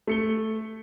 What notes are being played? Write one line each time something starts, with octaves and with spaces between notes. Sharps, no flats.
A3 C#7 G7